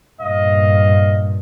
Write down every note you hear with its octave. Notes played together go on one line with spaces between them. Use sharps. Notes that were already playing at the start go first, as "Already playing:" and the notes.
G2 A#2 D#5 F5